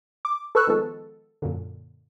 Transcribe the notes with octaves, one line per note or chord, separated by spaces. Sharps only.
D6
A4 B4 C#6 E6 F#6
D#3 F3 G#3 B3 A4
F#2 A#2 D3